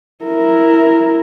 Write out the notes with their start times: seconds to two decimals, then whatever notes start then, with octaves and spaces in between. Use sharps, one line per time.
0.24 E4 A#4